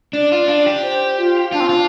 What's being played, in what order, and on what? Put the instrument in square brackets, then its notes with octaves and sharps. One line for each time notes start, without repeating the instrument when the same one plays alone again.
[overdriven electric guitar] D4 [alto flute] D5
[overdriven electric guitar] F4
D4
G4
[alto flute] C5
F4
[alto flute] D4 [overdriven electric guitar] F4
[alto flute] C4
[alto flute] D4 [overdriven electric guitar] F4